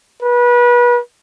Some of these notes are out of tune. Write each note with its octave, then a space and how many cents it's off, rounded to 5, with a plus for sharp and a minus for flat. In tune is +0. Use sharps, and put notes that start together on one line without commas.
B4 -30